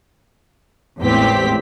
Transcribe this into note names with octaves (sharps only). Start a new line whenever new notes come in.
G#1 E2 A2 C4 G4 B6